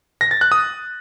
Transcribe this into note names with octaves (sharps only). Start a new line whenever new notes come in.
A#6
A6
F#6
D#6